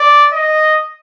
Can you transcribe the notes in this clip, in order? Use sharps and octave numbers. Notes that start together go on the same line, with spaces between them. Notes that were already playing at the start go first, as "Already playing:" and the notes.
Already playing: D5
D#5